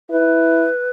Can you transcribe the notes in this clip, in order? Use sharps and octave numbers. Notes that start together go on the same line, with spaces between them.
E4 B4